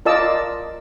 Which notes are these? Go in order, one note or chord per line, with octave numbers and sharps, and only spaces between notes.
F4 A#4 D5 D#5 A5 E6